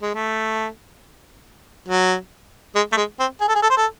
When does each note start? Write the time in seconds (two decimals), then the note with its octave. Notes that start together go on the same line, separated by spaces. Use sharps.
0.02 G#3
0.14 A3
1.88 F#3
2.75 G#3
2.92 A3
2.97 G#3
3.19 C4
3.40 G#4
3.48 A4
3.55 G#4
3.62 A4
3.70 C5
3.77 A4